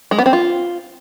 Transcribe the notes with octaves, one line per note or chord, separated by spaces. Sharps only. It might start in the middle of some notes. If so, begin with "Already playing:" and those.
G#3
B3
C4
F4